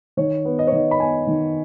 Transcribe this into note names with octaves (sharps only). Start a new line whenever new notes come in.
D#3 C#5
B3
D#5
C#5
D#3 D#5
B5
B3 G#5
D#3